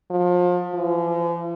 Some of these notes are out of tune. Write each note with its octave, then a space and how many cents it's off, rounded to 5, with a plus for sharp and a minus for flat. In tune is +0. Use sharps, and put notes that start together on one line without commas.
F3 +30
F3 -45